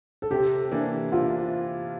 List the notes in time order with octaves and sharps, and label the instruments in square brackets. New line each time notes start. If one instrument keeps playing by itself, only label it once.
[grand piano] A4
[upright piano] C3 [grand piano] G4
[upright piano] E3 A#3 D4
[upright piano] C3 [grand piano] F4